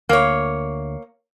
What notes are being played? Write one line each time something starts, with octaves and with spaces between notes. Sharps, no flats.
D2 A#3 C#5